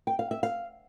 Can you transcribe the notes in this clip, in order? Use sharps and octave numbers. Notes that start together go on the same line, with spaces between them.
G5
F5
E5
F5